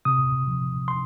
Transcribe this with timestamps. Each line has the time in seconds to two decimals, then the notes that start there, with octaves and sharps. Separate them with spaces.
0.05 C3 D#6
0.47 F3
0.88 C6